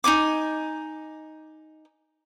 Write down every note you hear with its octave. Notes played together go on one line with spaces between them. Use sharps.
D#4 E4 G#5 D6